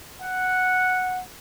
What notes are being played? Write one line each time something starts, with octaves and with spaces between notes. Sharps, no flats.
F#5